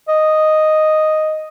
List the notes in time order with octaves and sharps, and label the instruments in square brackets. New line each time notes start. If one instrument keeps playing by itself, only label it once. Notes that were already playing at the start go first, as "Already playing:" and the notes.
[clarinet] D#5